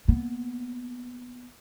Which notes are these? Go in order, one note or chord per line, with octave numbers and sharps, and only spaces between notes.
A#3 B3